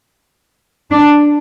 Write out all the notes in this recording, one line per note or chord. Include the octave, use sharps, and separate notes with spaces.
D4